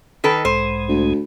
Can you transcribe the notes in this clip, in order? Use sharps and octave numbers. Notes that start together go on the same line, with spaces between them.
D#3 A4 B4
B1 G#2 G#3 C5
D2